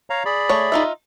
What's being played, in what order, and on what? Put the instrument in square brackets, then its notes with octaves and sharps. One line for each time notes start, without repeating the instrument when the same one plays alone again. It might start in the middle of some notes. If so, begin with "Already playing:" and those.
[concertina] C#5 F5 A#5
G#4 D5 B5
[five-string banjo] A3 C#5
D#4 F4 E5